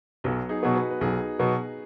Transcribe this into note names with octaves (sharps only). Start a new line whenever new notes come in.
B1 F#3 B3
D#4 G#4
B2 F#3 B3 G#4
F#4 B4
B4
B1 D#4 G#4
B2 F#3 B3